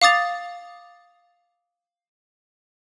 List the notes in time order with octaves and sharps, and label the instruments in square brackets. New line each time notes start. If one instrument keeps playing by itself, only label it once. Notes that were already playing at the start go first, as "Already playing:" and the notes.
[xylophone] F5 D6 D#6 A6 F7